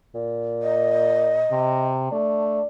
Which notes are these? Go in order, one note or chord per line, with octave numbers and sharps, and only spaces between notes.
A#2
D#5
C3
A3 D4